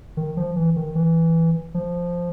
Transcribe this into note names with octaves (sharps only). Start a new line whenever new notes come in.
D#3
F3
E3
D#3
E3
F3